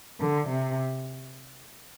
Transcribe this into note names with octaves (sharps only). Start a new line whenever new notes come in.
D3
C3